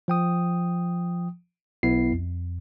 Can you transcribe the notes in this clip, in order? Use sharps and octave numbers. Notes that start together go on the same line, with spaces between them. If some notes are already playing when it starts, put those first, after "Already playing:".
F3 G5 D#6
B1 B3 E4 C7
F2